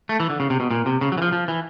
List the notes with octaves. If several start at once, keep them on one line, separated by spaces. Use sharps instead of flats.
A3
E3
D3
C#3
C3
B2
A#2
C3
C#3
F#3
E3
F3
F3
E3